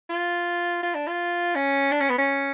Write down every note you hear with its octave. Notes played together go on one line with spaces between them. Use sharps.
F4
F4
D4
F4
C#4
D4
C#4
B3
C#4